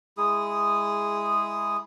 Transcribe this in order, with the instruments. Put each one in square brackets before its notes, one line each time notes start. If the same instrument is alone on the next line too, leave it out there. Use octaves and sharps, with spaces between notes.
[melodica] G#3 E4 G#4 D#6